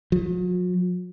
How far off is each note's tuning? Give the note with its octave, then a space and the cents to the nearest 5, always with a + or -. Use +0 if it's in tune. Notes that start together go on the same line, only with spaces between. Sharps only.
F#3 -45